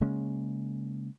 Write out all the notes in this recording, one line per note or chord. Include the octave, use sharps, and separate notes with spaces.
C#3 G#3 A#3 C#4